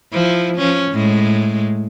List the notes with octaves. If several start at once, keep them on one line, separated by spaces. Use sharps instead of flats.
F3 E4
F3 C#4
A2 G#3